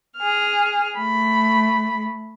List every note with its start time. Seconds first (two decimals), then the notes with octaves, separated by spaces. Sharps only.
0.18 G#4 F6
0.98 A3 B5